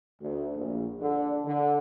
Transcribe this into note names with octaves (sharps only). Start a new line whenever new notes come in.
D2
A#1
D3
D3